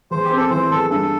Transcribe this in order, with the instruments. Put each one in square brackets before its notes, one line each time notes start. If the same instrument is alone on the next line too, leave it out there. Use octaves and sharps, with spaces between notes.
[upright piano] E2 [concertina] C5
[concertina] G4
[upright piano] C4
[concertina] A4
[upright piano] E3 [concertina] C5
[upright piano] E2 [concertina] A4
[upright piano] G2 [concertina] A4